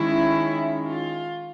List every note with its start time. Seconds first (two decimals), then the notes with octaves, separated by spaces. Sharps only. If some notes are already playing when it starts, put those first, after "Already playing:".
Already playing: D#3 G#3 C#4 E4
0.86 F4